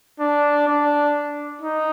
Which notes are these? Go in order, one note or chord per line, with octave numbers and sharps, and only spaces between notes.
D4
D4
D#4